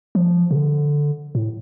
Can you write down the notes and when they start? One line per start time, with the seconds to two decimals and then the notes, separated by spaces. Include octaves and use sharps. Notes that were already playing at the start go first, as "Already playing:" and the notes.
0.15 F3
0.51 C3
0.55 D3
1.35 A2